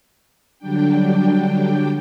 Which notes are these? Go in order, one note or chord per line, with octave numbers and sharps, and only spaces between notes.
D3 F#3 G3 D4 G5